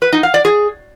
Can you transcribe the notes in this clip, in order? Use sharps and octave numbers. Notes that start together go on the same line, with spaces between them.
B4
D#4
F5
D5
G#4